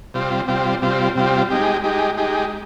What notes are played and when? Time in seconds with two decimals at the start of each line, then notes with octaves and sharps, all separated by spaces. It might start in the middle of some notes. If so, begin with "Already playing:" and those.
0.14 C3 G3 C4 F4
0.48 C3 G3 C4 F4
0.82 C3 G3 C4 F4
1.15 C3 G3 C4 F4
1.50 G#3 D#4 G4
1.84 G#3 D#4 G4
2.17 G#3 D#4 G4